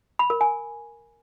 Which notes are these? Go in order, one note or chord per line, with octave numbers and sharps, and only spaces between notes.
B5
A#4
G#5